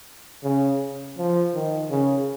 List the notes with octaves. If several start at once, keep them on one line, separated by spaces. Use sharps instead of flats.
C#3
F3
D#3
C#3